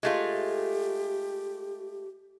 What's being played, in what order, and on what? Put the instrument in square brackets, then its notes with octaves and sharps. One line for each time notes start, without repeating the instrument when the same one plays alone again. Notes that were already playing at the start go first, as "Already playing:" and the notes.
[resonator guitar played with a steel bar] G#3 A3 F4 [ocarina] G4